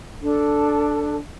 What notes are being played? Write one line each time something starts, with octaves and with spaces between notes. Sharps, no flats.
D4 A4